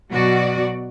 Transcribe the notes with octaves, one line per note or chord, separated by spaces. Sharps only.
B2 F#3 F#4 D5